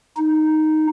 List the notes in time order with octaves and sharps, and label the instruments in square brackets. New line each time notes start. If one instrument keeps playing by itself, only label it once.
[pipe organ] D#4